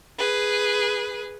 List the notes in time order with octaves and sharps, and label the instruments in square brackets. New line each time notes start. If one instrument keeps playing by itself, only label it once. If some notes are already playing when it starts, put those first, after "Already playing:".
[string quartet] G#4 B4